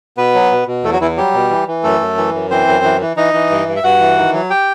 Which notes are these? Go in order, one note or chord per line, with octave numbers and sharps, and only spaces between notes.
B2 B3 B4
F#3
B2
B2
E2 A3 A4
F#3 F#4
E2 E3 E4
F#3 G3 G4
B2
E3
E3
F#2 A3 A4
F#2
E3
F#2
E3 C4 C5
F#2
E3
E3
E3 D#4 D#5
E3
G2
G2
E5
G2 F#4 F#5
E3
D#3
F#3
G4 G5